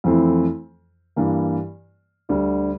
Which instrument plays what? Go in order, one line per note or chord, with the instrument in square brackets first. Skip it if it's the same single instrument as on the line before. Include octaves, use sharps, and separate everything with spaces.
[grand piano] F2 E3 A3 C4 E4
G2 E3 A#3
D2 D3 G3